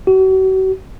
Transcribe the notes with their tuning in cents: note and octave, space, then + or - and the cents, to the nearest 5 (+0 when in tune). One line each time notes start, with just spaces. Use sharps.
F#4 +40